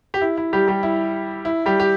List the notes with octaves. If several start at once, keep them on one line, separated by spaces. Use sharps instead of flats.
G4
E4
E4
G3 G4
G3 G4
E4
E4
G3 G4
G4